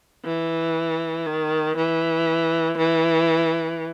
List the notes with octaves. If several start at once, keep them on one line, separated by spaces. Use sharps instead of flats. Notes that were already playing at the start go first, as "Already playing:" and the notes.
E3
D#3
E3
E3